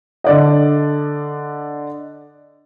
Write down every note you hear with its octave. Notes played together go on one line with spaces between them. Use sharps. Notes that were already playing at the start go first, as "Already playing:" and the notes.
D3 D5 D#5